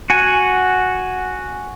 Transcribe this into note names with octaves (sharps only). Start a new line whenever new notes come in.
F#4 F#5 G#5